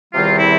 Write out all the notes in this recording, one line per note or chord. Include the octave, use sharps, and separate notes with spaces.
E2 C3 D#3 G3 C4 F4
E4